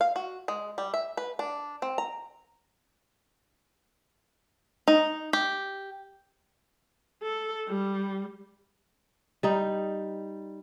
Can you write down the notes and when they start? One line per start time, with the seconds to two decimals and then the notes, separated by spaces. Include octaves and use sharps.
0.01 F5
0.16 F#4
0.48 G#3
0.78 G3
0.94 E5
1.17 B4
1.39 D4
1.82 C4
1.98 A#5
4.88 D#4
5.33 G4
7.23 A4
7.68 G3
9.43 G3 D#4